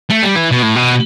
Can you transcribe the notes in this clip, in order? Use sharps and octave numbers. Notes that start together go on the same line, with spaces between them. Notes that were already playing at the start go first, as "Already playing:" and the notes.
A3
G3
E3
B2
A2
B2